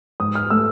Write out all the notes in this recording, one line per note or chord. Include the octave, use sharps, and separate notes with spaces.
G#2 D#6
F6
A3 E6